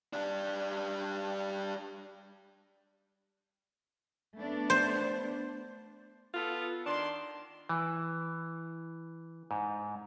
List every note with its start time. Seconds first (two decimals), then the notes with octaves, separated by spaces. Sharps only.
0.13 G3 D4
4.38 A3 B3 D4
4.70 C5
6.34 B3 F4 A4
6.85 D#3 D4 C6
7.69 E3
9.51 G#2